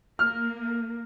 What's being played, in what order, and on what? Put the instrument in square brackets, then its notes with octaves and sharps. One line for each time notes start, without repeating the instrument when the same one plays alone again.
[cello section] A#3 [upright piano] F6